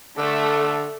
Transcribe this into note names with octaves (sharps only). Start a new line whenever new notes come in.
D3 A3